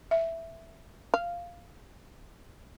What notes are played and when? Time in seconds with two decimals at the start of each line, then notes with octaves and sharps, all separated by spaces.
0.11 E5
1.14 F5